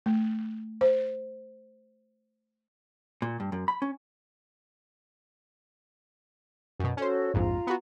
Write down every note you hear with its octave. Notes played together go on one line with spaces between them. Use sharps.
A3
C5
A#2
G2
F#2
B5
C#4
F#2 B2
C#4 F#4 A4 C5 C#5
A#1 F2 G#2 F4 A#5
B3 F#4